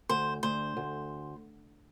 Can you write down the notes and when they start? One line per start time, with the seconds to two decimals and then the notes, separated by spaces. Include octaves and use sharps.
0.09 D2 C5
0.43 D2 C5
0.77 D2